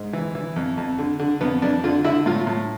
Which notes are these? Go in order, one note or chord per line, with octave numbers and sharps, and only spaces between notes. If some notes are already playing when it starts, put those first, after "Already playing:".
Already playing: G#2
E3
E3
F2
F2
D3
D3
F2 B3
F2 D4
D3 F4
D3 E4
A2 F4
A2